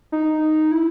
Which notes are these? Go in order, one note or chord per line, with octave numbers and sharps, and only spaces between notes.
D#4
E4